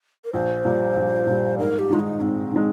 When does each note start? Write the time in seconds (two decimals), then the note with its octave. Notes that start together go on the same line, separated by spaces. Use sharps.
0.25 A#4
0.33 A#1 C5
0.65 A#2 G3
0.96 A#1
1.27 A#2 G3
1.58 G#2 A#4
1.79 G4
1.90 D#3 G#3 F4
2.00 D#4
2.20 G#2 C4
2.52 D#3 G#3